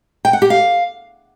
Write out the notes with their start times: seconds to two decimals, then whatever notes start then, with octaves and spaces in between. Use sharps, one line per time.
0.25 G5
0.33 F#5
0.42 G4
0.50 F5